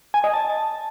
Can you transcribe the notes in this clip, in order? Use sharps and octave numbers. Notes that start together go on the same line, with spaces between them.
G#5
D#5
A5